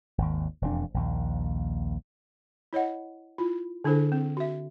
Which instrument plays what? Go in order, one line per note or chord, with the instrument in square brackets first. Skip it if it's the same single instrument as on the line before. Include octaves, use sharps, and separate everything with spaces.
[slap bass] G#1 D#2
E1 F2 D4
A#1 D#2
[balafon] E4 C#5 D#5 F#5
E4 F4
D3 D4 E4 A4 C5
C4
F#4 E5